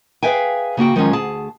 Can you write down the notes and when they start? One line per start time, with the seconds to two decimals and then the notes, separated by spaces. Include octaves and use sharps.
0.23 G#4 B4 E5 F5 G5 G#5
0.77 C#3 A#3 F#4 G5
0.96 D#3 F3 F#3 G#3 C4 C#4
1.13 D2 G#4 A5